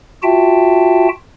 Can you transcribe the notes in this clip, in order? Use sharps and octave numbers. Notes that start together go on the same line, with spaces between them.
F4 F#4 E5 G5 A5